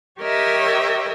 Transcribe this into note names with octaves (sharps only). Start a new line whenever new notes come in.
G4 A#4 C#5 D#5 E5